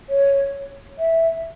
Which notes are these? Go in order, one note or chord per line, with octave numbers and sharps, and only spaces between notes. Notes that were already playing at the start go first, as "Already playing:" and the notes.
C#5
E5